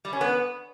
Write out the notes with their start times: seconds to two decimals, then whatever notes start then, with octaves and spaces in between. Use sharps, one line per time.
0.05 G3
0.13 C#4
0.21 B3